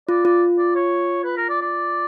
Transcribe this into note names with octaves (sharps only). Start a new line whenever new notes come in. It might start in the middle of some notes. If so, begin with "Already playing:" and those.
F4 D5
F4 D5
D5
C#5
B4
A#4
D5
D5